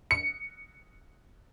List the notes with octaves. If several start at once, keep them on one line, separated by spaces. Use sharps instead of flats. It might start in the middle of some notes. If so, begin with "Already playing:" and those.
C#7